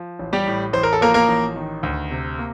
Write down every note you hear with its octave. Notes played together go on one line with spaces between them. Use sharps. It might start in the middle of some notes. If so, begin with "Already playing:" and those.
Already playing: F3
A1
G3 G4
A2
A1 C5
A#4
A4
F3 A#3 A#4
A#3 A#4
A1
D#3
D2
C3
A#3